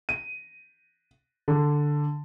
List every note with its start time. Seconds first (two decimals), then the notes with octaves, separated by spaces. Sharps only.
0.09 D#7
1.48 D3